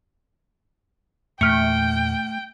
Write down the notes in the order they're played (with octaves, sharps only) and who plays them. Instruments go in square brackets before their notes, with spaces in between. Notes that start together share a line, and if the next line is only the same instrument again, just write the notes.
[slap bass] E2 A#2 [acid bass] A3 [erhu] G5 [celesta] F6 C#7